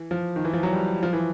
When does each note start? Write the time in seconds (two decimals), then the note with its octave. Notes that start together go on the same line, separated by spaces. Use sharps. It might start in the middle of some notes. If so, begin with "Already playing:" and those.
Already playing: E3
0.11 F3
0.36 D#3
0.45 E3
0.53 F3
0.63 F#3
0.72 G3
1.03 F3
1.13 E3